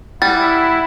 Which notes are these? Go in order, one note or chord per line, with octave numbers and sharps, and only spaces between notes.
G3 E4 F#5 A6